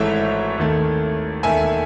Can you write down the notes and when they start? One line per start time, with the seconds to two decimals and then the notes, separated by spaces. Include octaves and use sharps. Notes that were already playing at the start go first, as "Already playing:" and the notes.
Already playing: G#1 G#2 E3 A3 C#5 E5
0.58 D#2 D#3 A3
1.43 E1 D#2 D#3 A3 E5 G#5